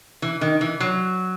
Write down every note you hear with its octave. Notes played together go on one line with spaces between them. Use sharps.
E3
D#3
E3
F#3